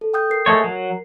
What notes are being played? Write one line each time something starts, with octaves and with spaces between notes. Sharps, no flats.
A4
G5 D#6 G6
A#4 C7
G#3 A3 C#5
F#3